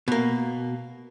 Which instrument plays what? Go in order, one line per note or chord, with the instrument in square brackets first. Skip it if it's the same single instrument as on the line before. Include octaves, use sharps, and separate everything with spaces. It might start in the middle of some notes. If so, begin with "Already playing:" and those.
[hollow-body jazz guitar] B2 A#3